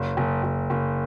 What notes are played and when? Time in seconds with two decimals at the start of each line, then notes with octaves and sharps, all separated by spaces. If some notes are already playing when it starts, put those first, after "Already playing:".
Already playing: F#1
0.17 F#1
0.43 F#1
0.70 F#1